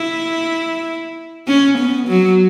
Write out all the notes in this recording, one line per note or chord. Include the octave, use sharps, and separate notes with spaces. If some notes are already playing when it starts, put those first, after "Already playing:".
Already playing: E4
C#4
B3
F#3